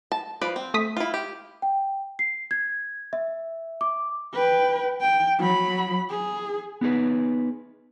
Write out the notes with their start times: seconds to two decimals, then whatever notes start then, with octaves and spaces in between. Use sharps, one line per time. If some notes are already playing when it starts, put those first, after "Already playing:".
0.12 A5
0.41 F3 B4 D5
0.56 C4
0.74 A3 D#6 B6
0.97 E4 F4
1.14 G4
1.62 G5
2.19 C7
2.51 G#6
3.13 E5
3.81 D6
4.34 B4 G5
5.01 G5
5.39 F#3 B5
6.10 G#4
6.81 B3 D#4 G#4 B4